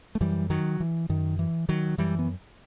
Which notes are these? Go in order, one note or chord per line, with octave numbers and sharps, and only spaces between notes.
A3
F#2 E3 G3
D#3 F#3
E3
F#2 D#3
E3
D#3 F#3
F#2 E3 G3
B3